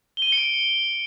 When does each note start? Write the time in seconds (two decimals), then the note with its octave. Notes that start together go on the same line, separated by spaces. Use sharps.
0.17 G7
0.22 D#7
0.27 G7
0.32 C#7
0.38 D7